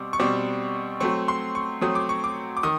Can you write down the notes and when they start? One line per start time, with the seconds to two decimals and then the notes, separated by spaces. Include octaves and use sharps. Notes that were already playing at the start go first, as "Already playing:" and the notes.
Already playing: B2 G3 C4 D6
0.13 C#6
0.19 B2 G3 C4 D6
1.00 F#3 A3 C4 C#6
1.28 C6
1.55 C#6
1.82 F#3 A3 C4 D#6
1.95 D6
2.09 C#6
2.24 D6
2.57 D6
2.63 D#3 D#6